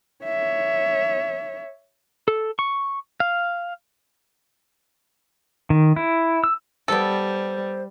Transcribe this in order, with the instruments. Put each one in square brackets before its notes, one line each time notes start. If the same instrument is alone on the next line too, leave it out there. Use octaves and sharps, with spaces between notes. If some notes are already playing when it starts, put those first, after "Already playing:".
[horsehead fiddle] C#5 E5
[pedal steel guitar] A4
C#6
F5
D#3
E4
E6
[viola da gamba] G3 [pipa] B3 A4 [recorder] C5